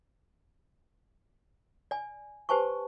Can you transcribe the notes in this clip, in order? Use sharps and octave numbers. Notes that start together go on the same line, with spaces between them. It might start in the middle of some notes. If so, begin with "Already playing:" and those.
D5 G#5
G4 B4 C5 G#5 A5 C#6